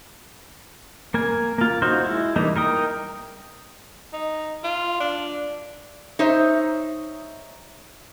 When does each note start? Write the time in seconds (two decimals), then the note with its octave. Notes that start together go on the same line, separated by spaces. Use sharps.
1.14 A#3 A#4 G#5
1.58 A#3 F4
1.82 D#4 F4 F#4 C5
2.04 G#3 E4
2.36 E3 G3 A#3 D#4
2.56 D#4 A#4 G5 D#6
4.13 D#4
4.64 F4
5.00 D4
6.19 D#4 C5 C#5 E5